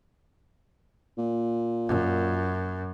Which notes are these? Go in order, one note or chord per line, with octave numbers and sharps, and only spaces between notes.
A#2
F#2